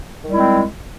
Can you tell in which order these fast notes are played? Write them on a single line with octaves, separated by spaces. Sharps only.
D#3 G3 G#3 E4 C4